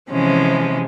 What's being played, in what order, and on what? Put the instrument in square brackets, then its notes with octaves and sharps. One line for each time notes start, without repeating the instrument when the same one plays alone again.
[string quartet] C3 E3 F3 G#3 C#4